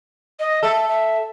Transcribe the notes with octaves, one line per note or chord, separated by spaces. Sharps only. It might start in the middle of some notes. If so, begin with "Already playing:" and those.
D#5
A4 E5
E5